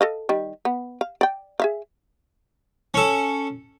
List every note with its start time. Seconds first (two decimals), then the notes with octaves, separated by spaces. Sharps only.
0.01 A4 D#5 F5
0.29 D#3 G3
0.65 B3
1.01 F5
1.21 D5 G5
1.60 G#4 E5 F5
2.94 C#4 A4